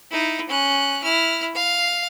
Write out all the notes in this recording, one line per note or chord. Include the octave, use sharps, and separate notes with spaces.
D#4 E4
C#4 F#6
E4 F6
F5